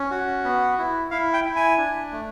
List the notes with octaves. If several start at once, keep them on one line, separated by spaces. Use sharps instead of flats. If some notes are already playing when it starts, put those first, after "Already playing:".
Already playing: C#4
F#4
B3
E4
E4 F5
G5
E4
G#5
D4
A3